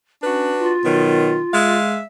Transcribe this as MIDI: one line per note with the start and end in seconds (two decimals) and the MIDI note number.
0.23 0.51 61
0.23 0.73 62
0.23 0.73 66
0.23 0.73 71
0.58 1.76 65
0.85 1.39 47
0.85 1.39 51
0.85 1.39 54
1.53 2.01 56
1.53 2.01 76
1.53 2.01 77